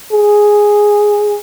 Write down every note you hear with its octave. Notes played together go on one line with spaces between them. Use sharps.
G#4